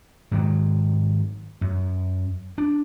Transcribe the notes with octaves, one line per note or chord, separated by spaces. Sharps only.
G#2 D#3 F#3
F#2
D4